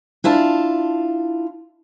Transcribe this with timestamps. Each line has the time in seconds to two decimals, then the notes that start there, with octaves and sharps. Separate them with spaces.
0.24 D4 E4 F4 A5